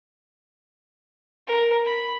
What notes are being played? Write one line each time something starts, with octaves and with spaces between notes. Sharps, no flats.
A#4
B5